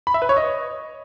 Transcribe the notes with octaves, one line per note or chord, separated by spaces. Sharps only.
B5
E5
B4
C#5
D#5